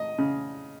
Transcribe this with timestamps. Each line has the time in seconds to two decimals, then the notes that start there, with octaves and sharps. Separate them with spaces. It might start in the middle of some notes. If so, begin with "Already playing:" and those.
Already playing: D#5
0.18 C#3